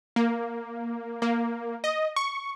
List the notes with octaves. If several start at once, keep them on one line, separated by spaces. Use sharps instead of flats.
A#3
A#3
D#5
C#6